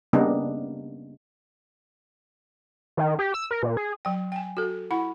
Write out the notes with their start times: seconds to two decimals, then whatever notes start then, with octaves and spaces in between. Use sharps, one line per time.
0.13 C#3 G3 A#3 B3 D4 D#4
2.97 D#3
3.19 G4
3.34 E6
3.51 A#4
3.63 A#2
3.77 G#4
4.05 F#3 G5
4.32 G5 G#5
4.57 F#4 A4
4.91 E4 F#5 B5